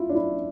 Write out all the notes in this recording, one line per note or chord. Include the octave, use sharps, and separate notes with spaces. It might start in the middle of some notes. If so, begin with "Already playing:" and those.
Already playing: E4 F4
D4
E4